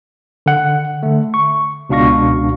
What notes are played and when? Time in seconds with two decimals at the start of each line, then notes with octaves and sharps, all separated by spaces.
0.46 D3 F#5
1.03 D3 A3
1.34 C#6
1.90 C#2 B2 D4 F5 C#6 A#6